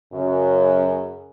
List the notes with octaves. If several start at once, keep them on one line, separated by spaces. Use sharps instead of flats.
F#2 C#3